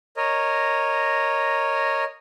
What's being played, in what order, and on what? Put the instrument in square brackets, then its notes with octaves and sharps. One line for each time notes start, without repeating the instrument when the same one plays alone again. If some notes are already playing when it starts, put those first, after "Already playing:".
[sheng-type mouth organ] A#4 C#5 D#5